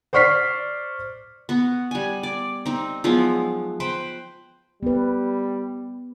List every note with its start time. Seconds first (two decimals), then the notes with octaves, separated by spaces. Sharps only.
0.13 C5 D5 C#6 F6 B6 C7
1.49 B3 F#4
1.91 G3 G#5
2.23 D5
2.66 C4 D#4
3.04 F3 F#3 G#3 B3
3.80 B4 C5 G5
4.83 G3 B3 B4